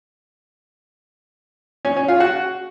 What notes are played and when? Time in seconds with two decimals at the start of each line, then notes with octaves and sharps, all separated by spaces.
1.85 C#4
1.96 C#4
2.08 F4
2.20 F#4